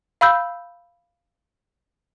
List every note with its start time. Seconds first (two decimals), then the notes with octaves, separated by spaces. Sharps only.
0.21 F5 B5 E6 G6